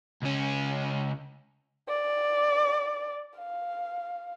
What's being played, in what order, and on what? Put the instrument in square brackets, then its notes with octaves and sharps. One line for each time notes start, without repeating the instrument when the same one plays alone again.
[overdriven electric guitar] C#2 C#4
[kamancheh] D5
F5